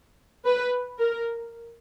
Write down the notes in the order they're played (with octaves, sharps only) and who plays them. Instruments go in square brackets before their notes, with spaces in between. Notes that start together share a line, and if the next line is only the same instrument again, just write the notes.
[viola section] B4
A#4